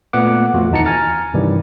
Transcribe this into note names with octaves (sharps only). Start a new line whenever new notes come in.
A#2 A3 B3 F#5 D6
F2 A3 F4 F#4
D#2 E3 D#4 A5 A#5 C#7
G#5 A#5 F6 A6
G2 C3 D#3 E3 G3